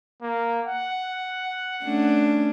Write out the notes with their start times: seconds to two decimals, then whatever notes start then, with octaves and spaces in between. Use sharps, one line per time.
0.22 A#3
0.66 F#5
1.85 A3 C#4 D4